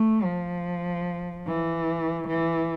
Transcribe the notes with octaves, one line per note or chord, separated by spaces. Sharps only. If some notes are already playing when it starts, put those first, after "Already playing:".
Already playing: A3
F3
E3
E3